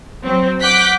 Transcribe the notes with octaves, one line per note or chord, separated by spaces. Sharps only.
F#3 C4
F#5 D6 F#6 G6 B6